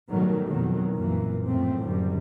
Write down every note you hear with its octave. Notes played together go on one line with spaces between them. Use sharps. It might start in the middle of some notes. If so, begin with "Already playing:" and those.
G#2 B2 D#3 F#3 G3 A3
F2 B2 D#3 E3 F#3
C2 F#2 A#2 E3 A#3
F#2 A2 F3 A3 C4
F#1 F#2 D3 G3